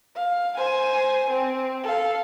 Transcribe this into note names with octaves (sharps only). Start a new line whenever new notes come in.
F5
C5 G#5
C4
A4 F5